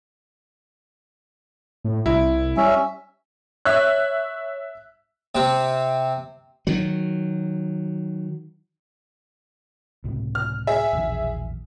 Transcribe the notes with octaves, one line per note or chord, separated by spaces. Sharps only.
A2
C2 E4
G3 C#4 E5
C#5 E5 E6 F#6
C3 C4
D#3 F#3
C#2 A2 C3
F6
G#4 E5
E1 A#1 D#3